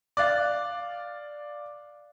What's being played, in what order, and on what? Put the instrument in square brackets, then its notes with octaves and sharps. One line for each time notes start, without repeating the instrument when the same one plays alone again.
[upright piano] D5 F5 [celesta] D6 F#6 A6